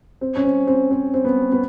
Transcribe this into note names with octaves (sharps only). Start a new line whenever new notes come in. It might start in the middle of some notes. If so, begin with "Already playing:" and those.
C4
C#4
C4
C4
C4
C4
B3
B3